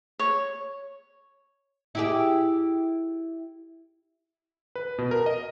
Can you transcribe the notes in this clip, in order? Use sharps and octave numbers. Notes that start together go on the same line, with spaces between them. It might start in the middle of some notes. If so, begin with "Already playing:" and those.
C#5
E4 G4 G#4
B4
B2
A#4
D#5